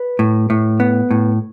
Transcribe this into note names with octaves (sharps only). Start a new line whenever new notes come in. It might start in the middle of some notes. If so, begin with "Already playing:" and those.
Already playing: B4
A2
A2
B3
A2